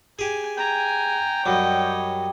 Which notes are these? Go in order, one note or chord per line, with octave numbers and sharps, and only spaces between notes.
G4 G#4 G#5
G5 G#5 A#5
F#2 F#3 G3 C#5 D#5